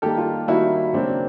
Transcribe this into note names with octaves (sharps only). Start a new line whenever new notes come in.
D#3 G3 A#3 G4 A4
F4 G4
D#3 G3 A#3 E4 F#4
C#3 F#3 A#3 C4 D4